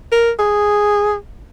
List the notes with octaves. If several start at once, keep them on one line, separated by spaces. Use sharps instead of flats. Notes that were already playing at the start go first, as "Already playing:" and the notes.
A#4
G#4